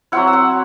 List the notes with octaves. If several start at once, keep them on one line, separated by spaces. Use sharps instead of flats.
F#3 C4 E4 F#5
E5
F#5